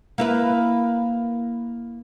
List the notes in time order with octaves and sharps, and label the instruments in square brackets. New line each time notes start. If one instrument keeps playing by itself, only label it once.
[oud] A#3 E4 B4